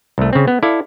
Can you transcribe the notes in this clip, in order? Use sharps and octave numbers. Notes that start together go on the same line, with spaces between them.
C2 A3
C#3 C4
B3
E4 A4 D5 F5